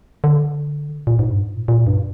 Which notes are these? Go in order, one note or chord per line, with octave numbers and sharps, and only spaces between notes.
D3
A#2
G#2
G2
G#2
A#2
A#2
G2